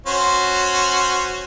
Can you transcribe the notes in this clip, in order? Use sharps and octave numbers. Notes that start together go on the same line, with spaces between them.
C#4 F#4 C5